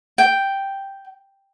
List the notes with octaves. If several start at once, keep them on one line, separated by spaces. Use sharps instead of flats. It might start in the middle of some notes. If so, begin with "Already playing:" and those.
G5